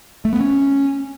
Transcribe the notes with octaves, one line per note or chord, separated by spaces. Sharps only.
A3
B3
C#4